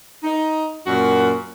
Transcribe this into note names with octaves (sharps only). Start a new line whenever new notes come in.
D#4
F#2 A#2 F#4